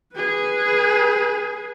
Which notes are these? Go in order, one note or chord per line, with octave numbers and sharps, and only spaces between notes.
G#4 B4